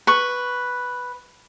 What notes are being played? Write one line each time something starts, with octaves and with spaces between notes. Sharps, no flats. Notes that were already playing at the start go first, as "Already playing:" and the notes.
B4 C#6